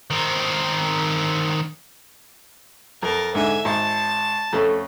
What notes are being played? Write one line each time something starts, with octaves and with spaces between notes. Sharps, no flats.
D#3 C4
F2 A#4 A5
G#2 D3 E5 G#5
G#1 A5
F2 A3 C#4